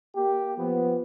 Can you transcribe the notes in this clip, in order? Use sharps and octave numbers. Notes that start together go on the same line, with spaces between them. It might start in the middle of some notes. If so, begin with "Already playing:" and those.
A#3 G4
F3 B3